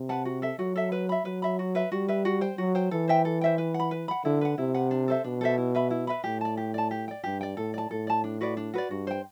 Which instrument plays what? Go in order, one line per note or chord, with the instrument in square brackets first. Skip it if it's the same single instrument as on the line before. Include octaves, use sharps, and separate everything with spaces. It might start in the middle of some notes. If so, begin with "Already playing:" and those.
Already playing: [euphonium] C3
[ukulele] B4 F#5 A5
F#4
A4 E5
[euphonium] F#3 [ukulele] F#4
[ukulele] A4 E5
B4
E5 B5
[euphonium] F#3 [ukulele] B4
[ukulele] E5 B5
F#4
B4 E5
[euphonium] G3 [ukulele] F#4
[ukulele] B4 E5
F#4
C5 G5
[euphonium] F#3 [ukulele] F#4
[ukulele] C5 G5
[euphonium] E3 [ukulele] A4
[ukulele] C5 E5 G5
A4
C5 E5 G5
B4
F#5
B5
B4
F#5 B5
[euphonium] D3 [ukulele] E4
[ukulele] B4 F#5
[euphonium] C3 [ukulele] E4
[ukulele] B4 F#5
D4
A4 C5 E5
[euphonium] B2 [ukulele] D4
[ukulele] A4 C5 E5
E4
B4 E5 B5
E4
B4 E5 B5
[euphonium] A2 [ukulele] G4
[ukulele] D5 A5
G4
D5 A5
G4
D5 G5
[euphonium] G2 [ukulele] G4
[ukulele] D5 G5
[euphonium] A2 [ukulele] A4
[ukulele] D5 A5
[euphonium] A2 [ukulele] A4
[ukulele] D5 A5
D4
F#4 B4 D5
D4
F#4 B4 D5
[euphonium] G2 [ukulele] F#4
[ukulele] C5 G5